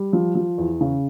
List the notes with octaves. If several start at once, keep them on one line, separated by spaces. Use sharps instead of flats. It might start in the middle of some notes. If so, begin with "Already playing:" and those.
Already playing: G3
F3
F3
E2
C#3